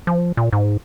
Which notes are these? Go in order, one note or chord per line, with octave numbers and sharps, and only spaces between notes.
F3
A#2
G#2